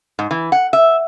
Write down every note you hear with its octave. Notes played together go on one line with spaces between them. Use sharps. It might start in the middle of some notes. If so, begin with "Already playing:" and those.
G#2
E3
F#5
E5